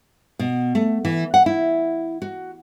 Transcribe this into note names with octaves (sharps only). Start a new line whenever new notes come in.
B2
A3
E3
F#5
E4
F#4